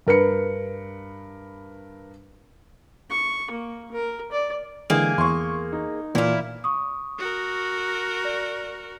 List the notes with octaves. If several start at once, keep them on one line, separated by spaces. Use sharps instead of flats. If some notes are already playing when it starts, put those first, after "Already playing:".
G2 A#4 B4 C#7
C#6
A#3
A#4
D5
D3 E3 G#3 A#3 G#4
E2 C6 C#6
D#4
A#2 E3 E4 F4
C#6 D#6
F#4 A#4
D5